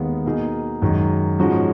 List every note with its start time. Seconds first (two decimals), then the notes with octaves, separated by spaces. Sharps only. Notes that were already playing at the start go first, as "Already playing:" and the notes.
Already playing: D#2 D#3 G#3 B3
0.25 B2 A#3 D#4 G#4
0.81 F#2 D#3 G#3
1.39 G#2 F3 G#3 C#4 F#4